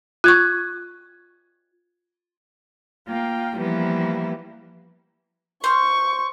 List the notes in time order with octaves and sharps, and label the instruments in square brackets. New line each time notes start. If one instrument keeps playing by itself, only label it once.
[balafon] F4 C#6 [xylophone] F#6 G#6
[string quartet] A#3 F4 G5
E3 F3 G3 A#3 B3 E4
[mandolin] C5 F6 [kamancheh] C#6